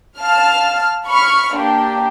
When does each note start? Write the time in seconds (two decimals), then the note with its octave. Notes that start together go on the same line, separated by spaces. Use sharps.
0.18 F5 A5 F6
1.07 B5 C#6 F6
1.54 A#3 D4 G4